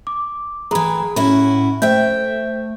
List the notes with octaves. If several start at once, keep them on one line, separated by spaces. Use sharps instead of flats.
D6
A2 E3 G#4 A#5 B5
A2 C#4 E4 F#4 B5
A3 C5 E5 G5 G6